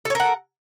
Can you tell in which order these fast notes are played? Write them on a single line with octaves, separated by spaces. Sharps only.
A4 C#5 A#4 F#5